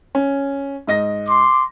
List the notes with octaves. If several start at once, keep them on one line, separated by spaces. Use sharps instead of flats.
C#4
G#2 D#5 A#6
C6 D6